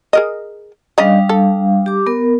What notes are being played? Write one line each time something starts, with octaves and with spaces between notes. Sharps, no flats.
G#4 A#4 D#5
C#3 G3 D4 D5 D#5 F5
A4
G4 D6
B3 A#4